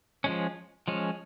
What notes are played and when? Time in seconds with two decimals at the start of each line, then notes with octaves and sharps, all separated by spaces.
0.24 F3 G#3 C#4
0.88 F3 G#3 C#4